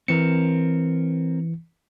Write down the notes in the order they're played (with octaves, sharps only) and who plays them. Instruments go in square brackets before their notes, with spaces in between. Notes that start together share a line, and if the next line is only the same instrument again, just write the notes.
[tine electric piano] E3 C#7 [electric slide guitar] C4 A#4